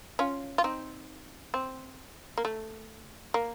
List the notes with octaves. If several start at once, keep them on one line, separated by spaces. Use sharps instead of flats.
C#4 F4
F4
C4 D#4
C4
A#3
A3
A#3